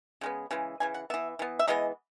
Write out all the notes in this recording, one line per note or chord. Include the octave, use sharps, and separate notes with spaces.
C#3 G#3 B3
C#3 E3 G#3
C#3 E3 G#5
F#5
E3 B3 E5
E3 B3
E5
E3 G#3 B3 D#5